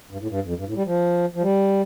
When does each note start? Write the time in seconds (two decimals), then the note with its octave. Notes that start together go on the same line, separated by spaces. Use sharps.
0.11 G2
0.21 A2
0.30 G2
0.44 F2
0.58 G2
0.67 A2
0.76 G3
0.86 F3
1.35 F3
1.42 G3